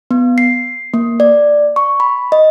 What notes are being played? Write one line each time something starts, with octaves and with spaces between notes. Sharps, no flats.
B3
C7
A#3
D5
C#6
B5
D#5